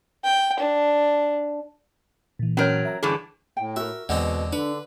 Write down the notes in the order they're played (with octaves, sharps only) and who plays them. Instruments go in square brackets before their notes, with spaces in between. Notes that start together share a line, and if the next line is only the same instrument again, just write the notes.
[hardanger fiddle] G5
D4
[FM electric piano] A#2 E3
[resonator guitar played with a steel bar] F#3 A#4 [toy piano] C#4 C#5
[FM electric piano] E5 A#5
[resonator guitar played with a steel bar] G2 D3 E3 [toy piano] G#4
[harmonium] A2 [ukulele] G5
[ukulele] F#4 A#4 [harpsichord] E5
[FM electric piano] E2 [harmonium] B2 [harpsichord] D3 G#3 C4 [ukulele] F#5
[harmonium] D3 [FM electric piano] D4 [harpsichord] B4